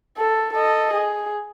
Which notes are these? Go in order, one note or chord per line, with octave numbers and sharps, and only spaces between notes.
A4
A4 D#5
G#4